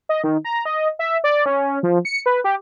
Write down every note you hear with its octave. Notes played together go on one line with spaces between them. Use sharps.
D#5
D#3
A#5
D#5
E5
D5
C#4
F3
C#7
B4
G4